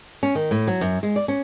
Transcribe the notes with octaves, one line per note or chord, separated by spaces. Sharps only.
C#4
D#3
A2
F#3
F#2
G#3
D5
C#4